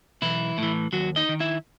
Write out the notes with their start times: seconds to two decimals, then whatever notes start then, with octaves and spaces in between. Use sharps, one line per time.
0.22 B1 E3 E4
0.58 A2 E3
0.93 D#2 F#3 F#4
1.16 D#4 D#5
1.29 D#3
1.40 E4 E5